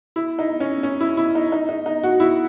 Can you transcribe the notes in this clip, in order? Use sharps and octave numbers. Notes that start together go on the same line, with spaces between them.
E4
D#4
C#4
C#4
E4
E4
D#4
D#4
D#4
D#4
F#4
E4